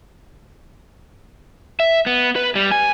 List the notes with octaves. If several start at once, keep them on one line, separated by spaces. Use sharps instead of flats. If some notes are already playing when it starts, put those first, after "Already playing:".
E5
B3
B4
G3
G#5